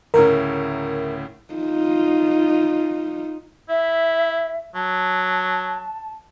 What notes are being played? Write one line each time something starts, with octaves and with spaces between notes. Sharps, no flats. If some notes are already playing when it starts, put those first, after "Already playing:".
D2 A2 C#3 A#4
D#4 F4
E4 E5
F#3 A5